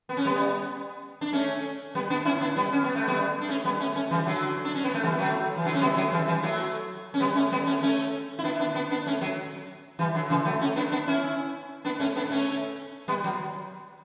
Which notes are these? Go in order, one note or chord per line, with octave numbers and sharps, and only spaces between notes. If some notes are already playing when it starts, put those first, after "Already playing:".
B3
C#4
G3 B3
D4
A3 C#4
G3 B3
B3 D4
C#4 E4
B3 D4
G3 B3
C#4
B3
A3
G3 B3
D4
A3 C#4
G3 B3
A3 C#4
A3 C#4
E3 G3
D3 F#3
D4
C#4
B3
A3
E3 G3
B3
F#3 A3
E3
D3 F#3
C#4
G3 B3
F#3 A3
E3 G3
E3 G3
F#3 A3
C#4
G3 B3
A3 C#4
G3 B3
A3 C#4
A3 C#4
E4
B3 D4
B3 D4
B3 D4
B3 D4
A3 C#4
F#3 A3
E3 G3
D3 F#3
C#3 E3
F#3 A3
A3 C#4
B3 D4
B3 D4
C#4 E4
B3 D4
A3 C#4
B3 D4
A3 C#4
G3 B3
F#3